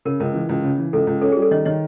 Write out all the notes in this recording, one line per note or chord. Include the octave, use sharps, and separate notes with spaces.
C#3 A#4
C#2 A#4
E3
C#2
C#3
E3
C#2 A4
C#2
C#4 A4
G#4
G3
A4
D#3 C#5 D#5
D#3 C#5 D#5